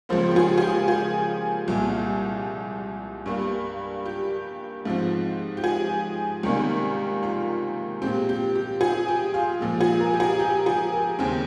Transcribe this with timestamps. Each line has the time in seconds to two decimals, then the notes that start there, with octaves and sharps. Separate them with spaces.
0.09 C#2 C#3 F3 A#3 C5
0.31 G4
0.36 G#4
0.58 G#4
0.62 G4
0.88 G#4
1.68 C2 A#2 G#3
3.26 G2 G3 A#3
4.06 G4
4.85 G#2 F3 C4
5.57 G4
5.64 G#4
6.43 C#2 C3 D#3 G3 A#3
7.23 F4
8.02 A#2 G#3 C4 G4
8.29 G4
8.55 G4
8.81 G#4
9.08 G4
9.34 F4
9.61 A#2 F3 G#3
9.81 G#4
10.01 A#4
10.13 G4
10.20 G#4
10.39 G4
10.66 G#4
10.93 A#4
11.19 D#2 C#3 G#3 C4 G5